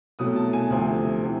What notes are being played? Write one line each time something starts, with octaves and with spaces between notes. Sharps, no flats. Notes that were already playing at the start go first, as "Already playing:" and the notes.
C2 B2 F#3 A3 D#6
A5
G#5
D2 C3 F3 A3 C4
C3 E3